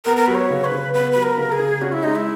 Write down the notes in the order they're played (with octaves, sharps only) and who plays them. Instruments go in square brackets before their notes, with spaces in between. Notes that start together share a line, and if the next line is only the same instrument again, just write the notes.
[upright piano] B3 [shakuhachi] A#4
[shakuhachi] A#4
[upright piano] F#3 [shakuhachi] B4
[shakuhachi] C#5
[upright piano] C#3
[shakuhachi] B4
[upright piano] C#3
[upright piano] B3 [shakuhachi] B4
[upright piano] F#3 [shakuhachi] B4
[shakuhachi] A#4
[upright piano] C#3
[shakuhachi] G#4
[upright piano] C#3
[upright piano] C#4 [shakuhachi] F#4
[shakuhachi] E4
[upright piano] G#3 [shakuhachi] D#4
[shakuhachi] E4